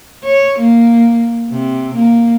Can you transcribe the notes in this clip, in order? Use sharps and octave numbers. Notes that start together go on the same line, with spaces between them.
C#5
A#3
C3
A#3